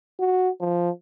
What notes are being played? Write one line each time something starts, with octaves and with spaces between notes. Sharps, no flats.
F#4
F3